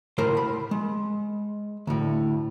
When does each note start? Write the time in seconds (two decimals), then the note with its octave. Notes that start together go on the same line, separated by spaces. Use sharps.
0.18 C#2 A2 A#4 C5
0.37 B5
0.71 G#3
1.87 D2 A2